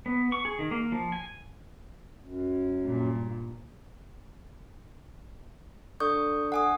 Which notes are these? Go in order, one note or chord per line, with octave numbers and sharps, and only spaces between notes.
B3
C#6
G#4
D#3
A#3
F3
G#5
F#2
G2 A#2
D3 C#6 D#6 G6
F#5 G#5 D#6